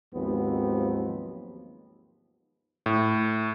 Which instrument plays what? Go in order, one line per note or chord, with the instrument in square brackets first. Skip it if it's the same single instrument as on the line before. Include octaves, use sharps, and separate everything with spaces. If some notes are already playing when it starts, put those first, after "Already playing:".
[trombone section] D#2 G#2 F3 F#3 B3 C4
[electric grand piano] A2